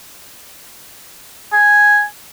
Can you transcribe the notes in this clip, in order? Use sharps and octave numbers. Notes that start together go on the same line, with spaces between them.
G#5